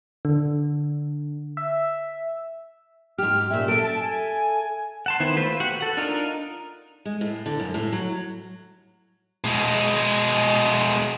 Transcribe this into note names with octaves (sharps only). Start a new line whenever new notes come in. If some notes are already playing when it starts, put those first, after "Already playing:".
D3
E5
G#2 G4 F6
A#2 C#4 E5
A4 E5 D7
A5
G#5
F#5 A5 C6
D#3 B3 E4 C5
A3 F4 B4 C5
F#4 G4 F#5
A4 F#5
D4 D#4 F4 A#4
G#3
A2
D3
F#2
A2
F#3
B2 G#3